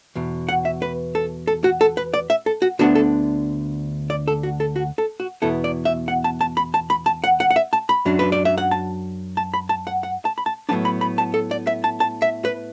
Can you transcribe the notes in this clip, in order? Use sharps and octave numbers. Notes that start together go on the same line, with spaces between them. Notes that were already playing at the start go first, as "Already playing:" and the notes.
E2 B2
F#5
E5
B4
A4
A4
F#4
A4
B4
D5
E5
A4
F#4
D2 D3 B3 D4 F#4
A4
D5
A4
F#4
A4
F#4
A4
F#4
E2 B2 B3 E4 A4
D5
E5
F#5
A5
A5
B5
A5
B5
A5
F#5
F#5
F#5
E5
A5
B5
F#2 F#3 D4
B4
D5
E5
F#5
A5
A5
B5
A5
F#5
F#5
A5
B5
A5
A2 F#3 B3 D4 A5
B5
B5
A5
A4
D5
E5
A5
A5
E5
B4